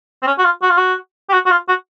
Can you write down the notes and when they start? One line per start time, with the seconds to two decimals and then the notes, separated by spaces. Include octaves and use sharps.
0.22 C4
0.27 C#4
0.39 F#4
0.45 F4
0.62 F#4
0.70 F4
0.78 F#4
1.29 G4
1.33 F#4
1.46 F#4
1.51 F4
1.69 F#4